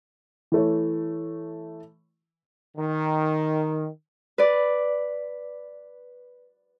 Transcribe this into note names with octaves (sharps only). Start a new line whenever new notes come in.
E3 A3 C#5
D#3
B4 D5